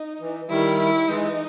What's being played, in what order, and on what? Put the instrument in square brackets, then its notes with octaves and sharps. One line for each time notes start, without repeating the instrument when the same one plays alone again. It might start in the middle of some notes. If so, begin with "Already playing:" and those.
Already playing: [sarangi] D#4
[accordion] E3
[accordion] D#3 G3 [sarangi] E4
[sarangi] E4
[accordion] E3 G#3 [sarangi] D#4